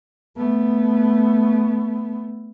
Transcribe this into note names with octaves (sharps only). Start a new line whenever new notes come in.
A3 B3